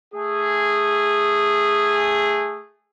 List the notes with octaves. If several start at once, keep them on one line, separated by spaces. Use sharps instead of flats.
A3 G#4